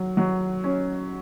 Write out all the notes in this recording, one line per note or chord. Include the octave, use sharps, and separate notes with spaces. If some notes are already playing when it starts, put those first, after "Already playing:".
Already playing: F#3
F#3
C#4